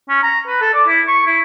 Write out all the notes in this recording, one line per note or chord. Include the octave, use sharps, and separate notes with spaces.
C#4
A#5
B4
A4
D5
E4
C#6
E4